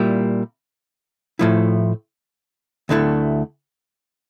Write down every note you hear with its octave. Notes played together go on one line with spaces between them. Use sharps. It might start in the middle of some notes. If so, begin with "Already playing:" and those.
Already playing: A#2 G3 A#3 E4
A2 F3 A3 E4
D2 D3 A3 E4